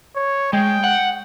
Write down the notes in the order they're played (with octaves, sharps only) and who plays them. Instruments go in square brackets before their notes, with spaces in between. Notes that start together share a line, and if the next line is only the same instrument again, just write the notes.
[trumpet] C#5
[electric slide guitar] G#3 [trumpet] G5
[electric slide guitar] F#5